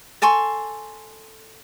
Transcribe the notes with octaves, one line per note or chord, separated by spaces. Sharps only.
A4 G#5 C6 C#6